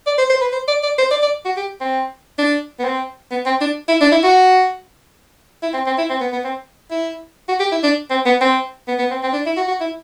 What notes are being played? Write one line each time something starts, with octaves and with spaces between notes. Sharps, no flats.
D5
C5
C5
B4
C5
D5
D5
C5
D5
D5
F#4
G4
C4
D4
B3
C4
B3
C4
D4
E4
D4
E4
F#4
E4
C4
C4
E4
C4
B3
B3
C4
E4
F#4
G4
E4
D4
C4
B3
C4
B3
B3
C4
C4
D4
E4
F#4
F#4
E4